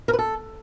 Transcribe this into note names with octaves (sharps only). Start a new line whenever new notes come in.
A#4
B4
A4